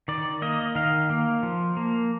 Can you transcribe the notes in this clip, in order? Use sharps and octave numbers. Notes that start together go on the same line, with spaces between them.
D#3 D5
A#3 D#5
D#3 F5
A#3
F3
A#3